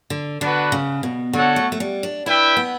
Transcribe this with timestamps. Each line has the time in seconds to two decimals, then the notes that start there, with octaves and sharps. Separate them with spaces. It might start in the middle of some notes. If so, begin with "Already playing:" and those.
0.10 D3
0.41 D3 B3 D4 F#4 B4
0.72 C#3
1.03 B2
1.33 D3 F#4 A4 C#5 F#5
1.56 A3
1.72 A3
1.80 G3
2.03 D4
2.26 D4 E4 B4 E5 G5
2.57 B3